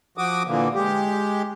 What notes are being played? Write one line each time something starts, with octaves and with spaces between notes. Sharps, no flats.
F3 F#4 D6 D#6
A#2 D3 E3 A#3
G#3 G4